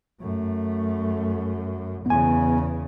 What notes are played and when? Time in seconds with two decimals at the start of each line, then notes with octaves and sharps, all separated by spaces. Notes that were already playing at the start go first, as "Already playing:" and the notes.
0.21 F#2 A3
2.06 E2 C#3 B3 G#5